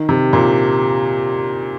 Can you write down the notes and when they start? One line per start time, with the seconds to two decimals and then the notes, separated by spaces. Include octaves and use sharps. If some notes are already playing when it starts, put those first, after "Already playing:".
Already playing: D#3
0.09 C3
0.33 A#2